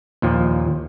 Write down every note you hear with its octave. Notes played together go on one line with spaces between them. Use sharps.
D#2 A#2 F3